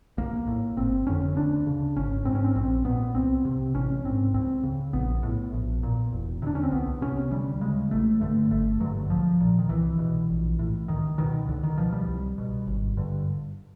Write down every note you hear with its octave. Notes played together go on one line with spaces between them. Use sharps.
B1 A#3
A2
G1 C4
F2 D3 C#4
D2 D4
C#3
G#1 C#4
G#2 C4
C#4
C4
A#1 C4
A#2 B3
C2 C4
C3
A1 C#4
G#2 C4
C#2 C4
C#3
A#1 B3
A2
A#1
A#2
E1
D2 C3 D4
C#4
C4
C2 B3
C3 C#4
D2 G3
C#3 G#3
A1 A3
G2 D3 A3
G1 A3
G2 D3 F#3
B1 F3
A#2
D#3
C2 E3
B2
A#1
A2
C#2 D#3
B2 D#3
C#2 D3
D#3
B2 F3
G3
C2
B2
G#1
G2 D3